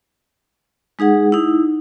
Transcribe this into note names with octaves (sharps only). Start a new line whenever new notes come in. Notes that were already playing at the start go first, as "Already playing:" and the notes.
G#3 D#4 G#4 F#5
D#4 E4